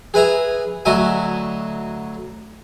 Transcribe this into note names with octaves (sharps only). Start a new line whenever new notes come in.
G#4 B4 E5 A#5
D2 F#3 D#5 E5 G#5